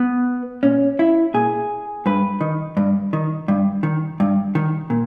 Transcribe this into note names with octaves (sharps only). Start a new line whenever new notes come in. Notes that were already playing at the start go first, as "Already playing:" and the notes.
Already playing: B3
A#2 C#4
E4
A#2 G#4
G2 B4
D#3
G2
D#3
G2
D#3
G2
D#3
A#2